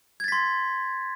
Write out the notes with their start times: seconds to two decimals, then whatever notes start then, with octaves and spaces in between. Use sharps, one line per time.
0.20 G#6
0.24 A6
0.28 B6
0.32 C6